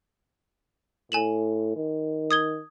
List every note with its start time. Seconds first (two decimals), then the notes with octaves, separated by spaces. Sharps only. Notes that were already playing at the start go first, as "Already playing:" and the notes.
1.12 A2 G#5 E7 F#7
1.76 D#3
2.31 D#6 G#6 G7